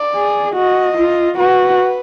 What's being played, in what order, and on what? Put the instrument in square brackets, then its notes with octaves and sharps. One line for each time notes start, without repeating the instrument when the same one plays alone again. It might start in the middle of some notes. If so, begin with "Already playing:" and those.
Already playing: [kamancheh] D5
[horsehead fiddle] G#4
[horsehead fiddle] F#4 [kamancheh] D#5
[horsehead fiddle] F4
[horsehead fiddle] F#4 [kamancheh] B4